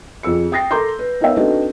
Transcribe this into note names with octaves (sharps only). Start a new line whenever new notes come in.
F2 G#4 E6 C#7
G5 D#6 A6 A#6 C7
A4 A#4 A#5 C6 D6 G6
B4
B3 D#4 A#4 C#5 E5 F5
C4 D4 D#4 F#4 A4 B4